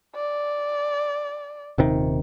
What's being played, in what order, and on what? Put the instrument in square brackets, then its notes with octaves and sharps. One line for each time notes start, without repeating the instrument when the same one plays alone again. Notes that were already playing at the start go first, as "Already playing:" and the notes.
[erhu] D5
[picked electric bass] D#1 C3 D#3